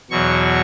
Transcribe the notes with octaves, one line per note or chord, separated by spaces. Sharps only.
E2 B2 F#3 C#6